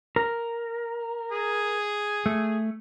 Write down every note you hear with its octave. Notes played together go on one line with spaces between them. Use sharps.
A#4
G#4
A3